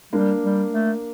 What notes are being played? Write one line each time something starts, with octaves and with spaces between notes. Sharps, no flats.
G3 A#3 D4
G3
A3